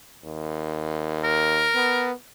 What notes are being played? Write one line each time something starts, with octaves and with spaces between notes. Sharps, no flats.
D#2
A#4
B3